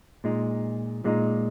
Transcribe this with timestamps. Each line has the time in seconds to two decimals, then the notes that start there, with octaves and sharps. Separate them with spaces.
0.24 A#2 G#3 D#4
1.05 A#2 G#3 D#4